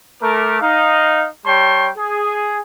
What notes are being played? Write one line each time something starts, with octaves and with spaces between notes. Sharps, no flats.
A3 A#4 D6
D#4 F5
G3 C#5 G5 A5 C6 C#6
G#4